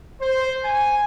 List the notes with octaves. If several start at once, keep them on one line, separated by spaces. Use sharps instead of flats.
C5
G#5